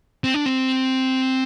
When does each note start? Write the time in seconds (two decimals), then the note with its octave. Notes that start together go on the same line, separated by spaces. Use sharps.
0.24 C4
0.34 D4
0.46 C4